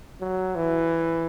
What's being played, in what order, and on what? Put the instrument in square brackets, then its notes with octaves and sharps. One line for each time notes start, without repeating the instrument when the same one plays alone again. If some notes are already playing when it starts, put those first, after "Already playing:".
[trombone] F#3
E3